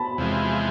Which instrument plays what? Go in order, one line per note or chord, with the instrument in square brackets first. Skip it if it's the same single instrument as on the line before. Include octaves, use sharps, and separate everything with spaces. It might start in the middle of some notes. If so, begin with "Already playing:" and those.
Already playing: [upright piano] A5 B5
[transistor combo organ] E2 C3 F3 G#3